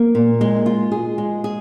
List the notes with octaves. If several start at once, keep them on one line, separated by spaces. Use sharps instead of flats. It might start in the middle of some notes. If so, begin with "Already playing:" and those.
Already playing: A#3
A#2
G#3
F4
G#4
G#3
G#4